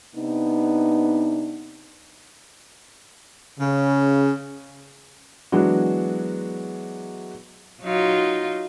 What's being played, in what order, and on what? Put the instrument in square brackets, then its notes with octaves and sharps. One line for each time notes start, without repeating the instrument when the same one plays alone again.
[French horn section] C3 B3 D4 D#4
[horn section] C#3
[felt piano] E3 F#3 G#3 B3 D4 F#4
[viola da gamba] F#3 D#4 F4